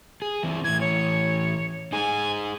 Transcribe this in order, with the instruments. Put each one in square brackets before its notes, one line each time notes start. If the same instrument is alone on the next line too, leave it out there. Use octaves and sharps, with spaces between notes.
[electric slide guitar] G#4
E3 C4
[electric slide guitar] A2 E3 [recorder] G#6
[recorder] C#5
[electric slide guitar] D#4 G#4 [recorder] G#5